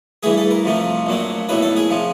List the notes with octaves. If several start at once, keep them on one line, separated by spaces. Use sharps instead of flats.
G2 E3 A3 G#4
A4
A#4
F2 C3 F3 A3
A#1 A#2 F#3 A3
B1 A2 F#3 A3 B4
A4
G#4
C3 F3